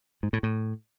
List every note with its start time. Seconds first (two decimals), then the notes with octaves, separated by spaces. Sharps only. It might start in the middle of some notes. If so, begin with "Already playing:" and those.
0.23 G#2
0.33 A2
0.43 A2